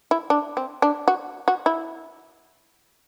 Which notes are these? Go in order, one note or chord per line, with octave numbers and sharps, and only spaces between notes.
E4
D4
C4
D4
F#4
F#4
E4